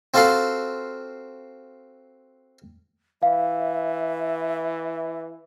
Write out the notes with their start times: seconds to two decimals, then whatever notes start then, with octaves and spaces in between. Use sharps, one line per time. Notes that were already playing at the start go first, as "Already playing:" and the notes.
0.14 C4 F4 F#4 A4 F5 C6
3.23 E3 E5 F5